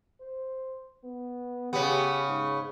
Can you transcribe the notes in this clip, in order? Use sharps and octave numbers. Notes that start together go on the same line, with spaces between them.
C5
B3
C#3 B3 G4
G#2